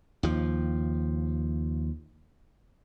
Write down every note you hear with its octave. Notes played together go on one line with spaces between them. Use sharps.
D#2 F3